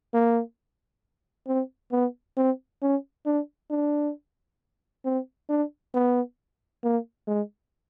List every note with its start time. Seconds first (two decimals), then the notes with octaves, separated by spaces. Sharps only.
0.14 A#3
1.47 C4
1.92 B3
2.37 C4
2.82 C#4
3.26 D4
3.71 D4
5.05 C4
5.49 D4
5.94 B3
6.84 A#3
7.27 G#3